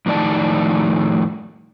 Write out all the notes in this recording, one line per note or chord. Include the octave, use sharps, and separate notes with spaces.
F2 A2 D#3 D5 A5